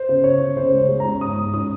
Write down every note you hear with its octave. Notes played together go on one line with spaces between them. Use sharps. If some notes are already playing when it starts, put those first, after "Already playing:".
Already playing: C5
C#3
C#3 C#5
C#3
C#3 C5
G#3
C#5
G#3
A#5
C#4
G#2 D#6
G#2
C#4 D#6